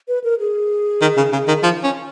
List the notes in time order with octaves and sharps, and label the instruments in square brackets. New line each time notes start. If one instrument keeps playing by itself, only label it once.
[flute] B4
A#4
G#4
[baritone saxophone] D#3
C#3
C#3
D#3
F3
C#4